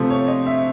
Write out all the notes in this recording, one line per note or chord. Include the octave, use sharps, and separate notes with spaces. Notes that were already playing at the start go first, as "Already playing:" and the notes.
Already playing: C3 F3 A3 C5
C#5
D#5
E5